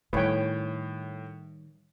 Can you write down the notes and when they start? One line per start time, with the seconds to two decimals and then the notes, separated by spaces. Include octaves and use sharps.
0.13 A2 D#3 G3 B4 C#5 G5